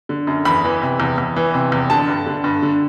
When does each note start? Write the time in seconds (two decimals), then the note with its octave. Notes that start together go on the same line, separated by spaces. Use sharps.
0.09 D3
0.27 F#2
0.45 E2 B5
0.64 E3
0.82 C3
1.00 E2
1.18 E2
1.36 E3
1.54 C3
1.72 E2
1.90 D3 A5
2.07 G2
2.26 D3
2.44 G2
2.62 D3